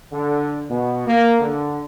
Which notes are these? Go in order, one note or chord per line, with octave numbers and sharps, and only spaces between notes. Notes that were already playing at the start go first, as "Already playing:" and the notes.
D3
B2
A#3
D3